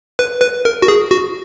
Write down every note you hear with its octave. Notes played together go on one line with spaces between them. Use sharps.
B4
B4
A#4
F#4
G#4
F#4